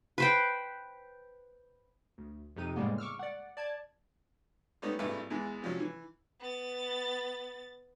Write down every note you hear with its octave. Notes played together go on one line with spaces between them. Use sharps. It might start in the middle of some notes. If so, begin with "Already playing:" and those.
B4 C5 G5
D2
F2 C3 D#4 D#7
A2 C#3 G3 G#3 A#3 B3
C#6 D6 E6 F6
D5 F#5
D5 A5 G#6
G3 A3 B3 C#4 D#4
G#1 G2 A#3 E4 A4 B4
E2 E3 G#3
C3 F3 F#3 C#4
E3
B3 A6